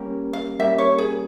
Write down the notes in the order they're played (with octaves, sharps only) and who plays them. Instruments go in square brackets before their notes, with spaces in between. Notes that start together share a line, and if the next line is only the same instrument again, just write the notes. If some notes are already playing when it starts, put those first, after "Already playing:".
Already playing: [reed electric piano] G3 A#3 C#4 G4 A#4
[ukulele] F5
[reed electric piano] G3 A#3 C#4 G4 A#4 [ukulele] E5
[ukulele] C#5
G#4